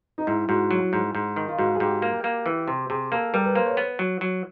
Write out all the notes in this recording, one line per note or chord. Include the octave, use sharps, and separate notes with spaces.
D#4
G#2 E4
G#2 F#4
F#3
G#2
G#2
D#3
F4
G#2 F#4
G#4
G#2 G4
A#3
A#3
E3
C3
C3 G#4
A#3 A4
G3 A#4
B4
A#3 C5
C#5
B3
F#3
F#3